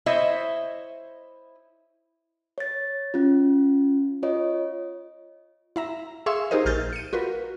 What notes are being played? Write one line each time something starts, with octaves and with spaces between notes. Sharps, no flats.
E4 C5 C#5 D#5 E5
C#5 A6
C#4 F4
F4 C#5 D#5
E4 E5 A#5
G#4 E5 F5 C6 C#6 E6
D#4 G4 G#4 A#4 C5 D#5
A#1 F6 G6 A6
C#7 D#7
F4 F#4 A#4 B4